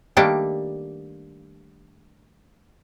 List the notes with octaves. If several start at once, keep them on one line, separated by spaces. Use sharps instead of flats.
D#3 G3 A3 A#3 D4